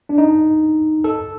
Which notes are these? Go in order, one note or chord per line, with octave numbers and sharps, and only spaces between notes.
D4
D#4
A4